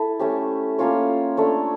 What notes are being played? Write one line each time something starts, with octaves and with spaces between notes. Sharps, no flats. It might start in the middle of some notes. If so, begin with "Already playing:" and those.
Already playing: E4 A4
A3 C#4 G4
A#3 C#4 F4 C#5
A3 D4 A4 C#5